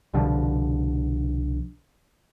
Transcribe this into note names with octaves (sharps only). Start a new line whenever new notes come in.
C2 B2 D3 F3